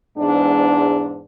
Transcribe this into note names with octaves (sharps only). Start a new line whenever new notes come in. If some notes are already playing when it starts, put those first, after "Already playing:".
E2 G#2 D4